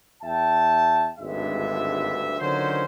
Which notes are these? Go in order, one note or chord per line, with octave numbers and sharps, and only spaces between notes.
E2 E5 G5 A5
G#1 D2 G2 D3 G#3 E5
D3 D#3 F3 F#3 C#4 C5